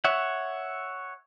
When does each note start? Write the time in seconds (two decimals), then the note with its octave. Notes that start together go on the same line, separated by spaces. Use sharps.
0.04 C#5 E5 F#5